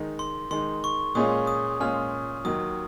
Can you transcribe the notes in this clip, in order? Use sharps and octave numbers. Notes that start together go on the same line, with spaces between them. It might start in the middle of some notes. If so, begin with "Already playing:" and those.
Already playing: D#3 G#3 D#4
C6
D#3 G#3 D#4 C6
C#6
A#2 G#3 C#4 F4 G#4 D#6
D#6
A#2 G#3 C#4 F4 G#4 F6
D#2 D#3 F#3 D#6